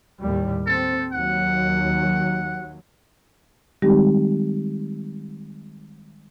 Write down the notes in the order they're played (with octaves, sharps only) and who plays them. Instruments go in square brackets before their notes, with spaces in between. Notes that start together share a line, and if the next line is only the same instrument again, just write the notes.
[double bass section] D#2 A2 G3
[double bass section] C4 [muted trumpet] A4
[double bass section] D#2 F#3 [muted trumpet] F#5
[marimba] D#3 G3 G#3 C4 D#4 G4